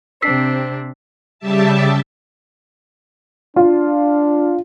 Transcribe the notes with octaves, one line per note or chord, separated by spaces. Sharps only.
C3 C4 D4 E6 B6 C7
C#3 G3 G4 E5 A5
D4 F4